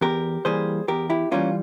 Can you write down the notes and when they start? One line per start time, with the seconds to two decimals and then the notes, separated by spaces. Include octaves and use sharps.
0.01 E2 G4 A#4
0.45 E3 G3 A#3 G#4 C5
0.88 E2 G4 A#4
1.10 E4 G4
1.32 E3 G3 A#3 C#4 F4